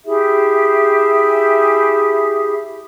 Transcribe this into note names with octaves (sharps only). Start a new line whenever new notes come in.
E4 G4 G#4 E5